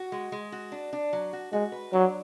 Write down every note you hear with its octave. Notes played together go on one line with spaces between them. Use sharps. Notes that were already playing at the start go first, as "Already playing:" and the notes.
Already playing: F#4
G#3
G#3
F#4
D4
D4
F#3
F#4
G#3 F#4
B4
F#3 D4